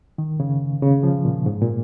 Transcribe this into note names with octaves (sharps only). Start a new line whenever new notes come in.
D#3
C#3
C#3
F3
A#2
G#2
A#2